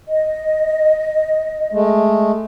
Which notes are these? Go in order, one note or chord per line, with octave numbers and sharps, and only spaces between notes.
D#5
G#3 A3